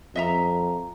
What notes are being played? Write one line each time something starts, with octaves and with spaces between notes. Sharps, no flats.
F2 D#5 E5 A#5